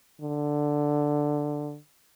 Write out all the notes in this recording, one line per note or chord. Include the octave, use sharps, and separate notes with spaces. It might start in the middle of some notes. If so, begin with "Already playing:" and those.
D3